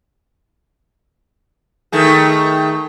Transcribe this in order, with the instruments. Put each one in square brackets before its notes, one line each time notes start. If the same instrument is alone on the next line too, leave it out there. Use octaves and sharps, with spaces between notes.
[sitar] D#3 A3 G#4